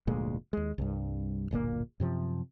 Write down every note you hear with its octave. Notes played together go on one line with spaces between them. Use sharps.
F1 D2 A#2 G#3
D#2 G#3
C2 G2
D1 G1 A#2 A#3
F#2 C3 F3